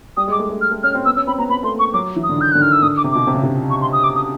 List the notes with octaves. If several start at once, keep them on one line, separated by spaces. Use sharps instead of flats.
G3 D#6
G#3
D6
A3
A3
F6
A3
C#4 F6
C4
B3 E6
C#4 E6
C4 B5
B3 A#5
B3 B5
A3 C6
A#3
C#6
F#3 D6
E3
D#6
D3
D#3 G6
D3 F#6
D#3 F6
E6
D3 D#6
D6
C3
B2 D6
C3
C#3
C3
C#6
C6
D#6
D6
D#6